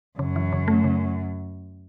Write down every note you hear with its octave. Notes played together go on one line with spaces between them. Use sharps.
F#2 C#3
E3
C#3
A3
C#3